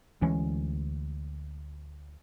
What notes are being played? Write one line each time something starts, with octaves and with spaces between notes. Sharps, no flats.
D2 E3 G#3 C#4